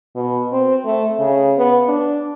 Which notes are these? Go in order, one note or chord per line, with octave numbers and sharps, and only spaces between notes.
B2
C4
A3
C#3
B3
D4